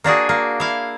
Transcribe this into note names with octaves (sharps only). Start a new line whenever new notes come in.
A#3 D4 F#4 G#4
A#3
E4 F5